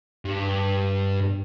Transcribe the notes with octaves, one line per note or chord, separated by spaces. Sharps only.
G2